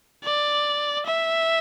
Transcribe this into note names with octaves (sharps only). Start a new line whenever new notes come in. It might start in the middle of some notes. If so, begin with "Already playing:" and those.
D5
E5